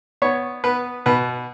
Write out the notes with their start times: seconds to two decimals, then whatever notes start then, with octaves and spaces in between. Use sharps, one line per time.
0.22 B3 C#5
0.64 B3 B4
1.06 B2 B4